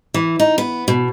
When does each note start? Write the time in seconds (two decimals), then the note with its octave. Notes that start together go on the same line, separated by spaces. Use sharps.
0.14 E3
0.40 D#4
0.58 B3
0.88 B2